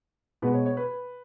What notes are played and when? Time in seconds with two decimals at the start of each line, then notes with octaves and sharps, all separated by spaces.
0.42 B2 G#3 B3 B4
0.54 C#5
0.66 C#5
0.77 B4